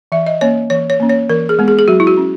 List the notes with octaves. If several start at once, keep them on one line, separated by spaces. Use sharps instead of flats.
E3 E5
D#5
A#3 C#4 C#5
E3 C#5
C#5
A#3 C#4
C#5
E3 A#4
G#4
G#3 B3
G#4
G#4
F#3 F#4
E4
F#4
C#4